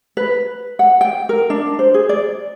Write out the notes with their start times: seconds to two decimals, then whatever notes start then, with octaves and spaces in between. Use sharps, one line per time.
0.17 B4
0.79 F#5
1.01 G5
1.29 A#4
1.50 D4
1.79 C5
1.94 G#4
2.09 D5